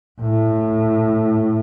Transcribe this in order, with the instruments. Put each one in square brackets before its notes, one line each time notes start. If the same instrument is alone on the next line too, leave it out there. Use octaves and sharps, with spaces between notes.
[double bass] A2